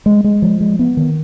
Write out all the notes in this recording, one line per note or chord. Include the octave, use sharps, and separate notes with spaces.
G#3
G#3
F3
G#3
B3
D#3